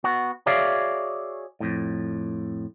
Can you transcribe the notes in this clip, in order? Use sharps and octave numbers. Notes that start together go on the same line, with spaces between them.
B3 F#4
F#4 G#4 C#5 D5 E5 F5
F2 A2